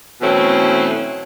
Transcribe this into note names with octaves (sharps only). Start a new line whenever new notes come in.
B2 E3 F#3 A3 C4 C#4